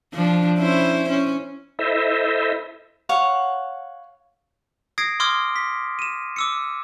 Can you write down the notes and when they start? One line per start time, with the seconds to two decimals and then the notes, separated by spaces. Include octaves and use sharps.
0.13 F3 D4
0.58 C#4 E4 C5
1.09 C#4
1.79 E4 A4 C5 D#5 E5
3.09 C#5 F5 F#5
4.98 D#6 G#6 A#6 C7 D7
5.20 C6 D6 D#6 F6 G#6
5.56 B6
5.99 D#7 E7
6.36 D6 E6 C#7